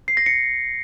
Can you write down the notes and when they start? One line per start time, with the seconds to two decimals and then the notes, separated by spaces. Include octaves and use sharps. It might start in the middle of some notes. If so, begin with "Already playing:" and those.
0.08 C7
0.17 A#6
0.26 C#7